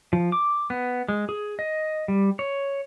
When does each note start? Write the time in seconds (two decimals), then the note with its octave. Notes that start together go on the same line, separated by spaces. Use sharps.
0.13 F3
0.32 D6
0.70 B3
1.08 G#3
1.29 G#4
1.59 D#5
2.08 G3
2.39 C#5